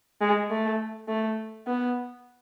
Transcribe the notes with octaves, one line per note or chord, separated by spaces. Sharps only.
G#3
A3
A3
B3